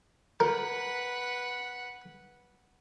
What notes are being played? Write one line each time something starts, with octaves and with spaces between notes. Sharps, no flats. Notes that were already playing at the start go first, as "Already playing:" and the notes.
A#4 B4 F#5